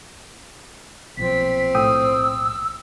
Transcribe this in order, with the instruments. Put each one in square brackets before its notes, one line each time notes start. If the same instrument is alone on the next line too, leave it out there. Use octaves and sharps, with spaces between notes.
[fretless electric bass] B1 A#2 F3 [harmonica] C4 [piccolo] B6
[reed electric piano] A2 G5 D#6 [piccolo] E6